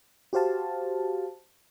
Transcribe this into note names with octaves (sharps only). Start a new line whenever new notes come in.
F#4 G4 C5 F5 A5